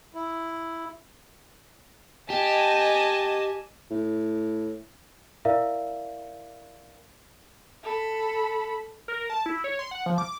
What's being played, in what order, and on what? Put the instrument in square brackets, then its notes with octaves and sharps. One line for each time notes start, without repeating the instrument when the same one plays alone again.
[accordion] E4
[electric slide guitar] G4 [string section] D#5 G#5 A5
[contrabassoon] A2
[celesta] E4 A#4 D5 E5 F5
[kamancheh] A4 B5
[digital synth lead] A#4
A5
E4
C#5
C6
F#5
F3
D6